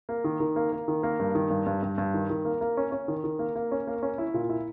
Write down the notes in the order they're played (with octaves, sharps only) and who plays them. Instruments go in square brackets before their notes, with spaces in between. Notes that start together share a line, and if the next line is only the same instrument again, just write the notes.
[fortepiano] A#3
D#3
D#3
A#3
A#3
D#3
A#3
G2
D#3
G2
G2
G2
G2
D#3
D#3
A#3
A#3
C#4
C#4
D#3
D#3
A#3
A#3
C#4
A#3
C#4
E4
A#2
E4